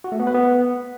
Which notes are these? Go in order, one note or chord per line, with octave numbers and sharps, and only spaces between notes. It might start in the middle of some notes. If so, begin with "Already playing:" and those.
F#4
A3
B3
B4
B3